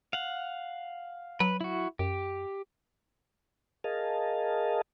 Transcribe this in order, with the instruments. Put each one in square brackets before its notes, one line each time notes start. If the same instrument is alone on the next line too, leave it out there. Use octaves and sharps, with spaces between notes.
[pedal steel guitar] F5 F#5
[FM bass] F#3 [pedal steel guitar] B4
[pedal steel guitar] E4 F#4
[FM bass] F#2 [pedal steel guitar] G4
[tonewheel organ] G#4 A#4 D#5 F5 A5